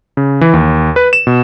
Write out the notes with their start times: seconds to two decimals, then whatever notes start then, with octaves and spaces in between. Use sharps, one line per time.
0.17 C#3
0.41 E3
0.53 D#2
0.96 B4
1.13 E7
1.27 B2